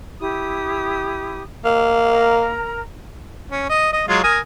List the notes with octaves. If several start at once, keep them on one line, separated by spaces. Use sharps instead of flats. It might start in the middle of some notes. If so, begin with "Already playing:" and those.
E4 G4 D#6
A#3
A#4 A#5
C#4
D#5
D#5
F#3 G#3 F4
A#4 G#5 D#6